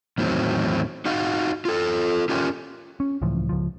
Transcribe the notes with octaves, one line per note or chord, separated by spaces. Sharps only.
E2 A2 D#3 F#3 C4
D#4 F#4 F5 F#5
F4 A4
C#4 F4 G4 A#4
C#4
C#2 A2 E3 F3
C#2 F3